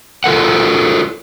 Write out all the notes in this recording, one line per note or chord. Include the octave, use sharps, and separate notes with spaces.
F4 A4 A#4 F#5